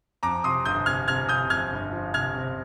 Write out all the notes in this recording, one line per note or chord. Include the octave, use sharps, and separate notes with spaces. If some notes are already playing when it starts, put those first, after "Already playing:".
F2 A#5 D6
C3 C6 D#6
G1 D#6 G6
C3 F6 G#6
C3 F6 G#6
C3 D#6 G6
F2 F6 G#6
G1
F3
C3 F6 G#6
C3